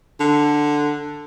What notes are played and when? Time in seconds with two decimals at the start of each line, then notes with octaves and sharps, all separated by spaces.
0.20 D3